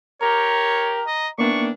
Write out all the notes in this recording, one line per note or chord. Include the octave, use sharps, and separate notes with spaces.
G4 A#4 C#5 A#5
D#5
D#3 E3 A#3 B3 D4 C#6